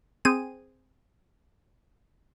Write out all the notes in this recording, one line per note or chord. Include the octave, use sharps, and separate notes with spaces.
C4 G#4 D#7